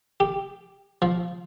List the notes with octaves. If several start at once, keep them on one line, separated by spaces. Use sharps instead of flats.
G4
F3